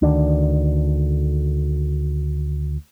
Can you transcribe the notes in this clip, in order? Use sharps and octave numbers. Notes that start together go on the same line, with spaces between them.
D2 D#3 D4